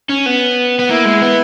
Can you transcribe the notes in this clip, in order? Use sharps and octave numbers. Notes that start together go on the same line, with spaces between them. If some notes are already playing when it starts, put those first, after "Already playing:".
C#4
B3
B3
A#3 E4
G#3
B3